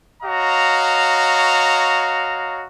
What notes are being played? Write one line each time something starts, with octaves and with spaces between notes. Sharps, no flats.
F#4 C#5 D#5 F5 A#5